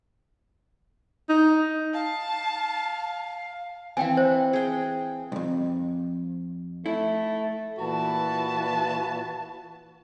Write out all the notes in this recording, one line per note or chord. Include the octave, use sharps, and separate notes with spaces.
D#4
F5 A5
E3 C4 F5 G5 G#5
C5
G#4 G5
B1 F2
A3 E4
A#2 E3 F4 F#4 B4 A5